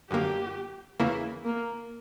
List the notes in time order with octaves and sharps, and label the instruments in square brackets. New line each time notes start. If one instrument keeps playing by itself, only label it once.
[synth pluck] F#2 D3 A#3 [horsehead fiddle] G4
[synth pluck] E2 C#3 E3 A#3 E4
[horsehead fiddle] A#3